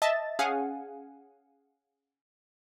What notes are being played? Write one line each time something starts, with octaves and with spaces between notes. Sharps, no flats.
D#5 E5 A5 A6
C#4 G#4 F5 F#5 G#5